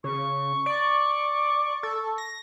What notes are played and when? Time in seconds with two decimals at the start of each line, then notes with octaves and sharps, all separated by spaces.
0.04 C#3 C#6
0.66 D5
1.83 A4
2.18 A#6